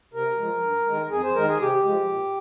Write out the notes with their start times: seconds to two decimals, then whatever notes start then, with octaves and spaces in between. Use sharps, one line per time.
0.13 C3 A#4
0.38 F3 G#3
0.62 G2
0.87 D#3 G#3
1.11 F2 G#4
1.23 C5
1.35 D#3 G#3 A#4
1.47 G#4
1.59 C3 G4
1.84 F3 G#3
2.08 A#2